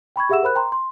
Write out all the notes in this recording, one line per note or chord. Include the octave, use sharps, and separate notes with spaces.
G5 B5 C#6 G#6
G4 G#4 E5 F#5 E6 E7
A#4 C5 B5 F#6
G5 A#5 C6
C6